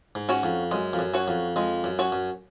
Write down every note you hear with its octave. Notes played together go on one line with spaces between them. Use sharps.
G#2
C#4 F#4 C#5
F2
F#2 G#3
F2
F#2
C#4 F#4 C#5
F2
F2 G#3
F#2
C#4 F#4 C#5
F#2